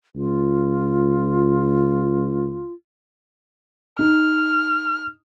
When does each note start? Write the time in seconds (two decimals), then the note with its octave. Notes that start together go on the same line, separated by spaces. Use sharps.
0.16 C#2 F4
3.99 D#4 F6